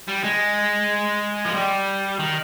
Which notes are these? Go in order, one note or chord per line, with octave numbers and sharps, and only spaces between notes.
G3
G#3
F3
G3
D#3